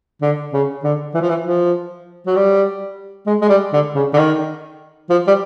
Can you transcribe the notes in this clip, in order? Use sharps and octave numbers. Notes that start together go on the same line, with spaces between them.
D3
C#3
D3
E3
F3
E3
F3
F#3
G3
G#3
G#3
G3
D3
C#3
D3
D#3
F3
G3